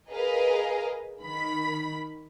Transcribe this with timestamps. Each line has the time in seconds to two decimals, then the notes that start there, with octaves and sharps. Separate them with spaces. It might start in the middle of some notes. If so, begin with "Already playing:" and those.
0.11 G#4 A#4 B4 D#5 F5
1.21 D#3 B5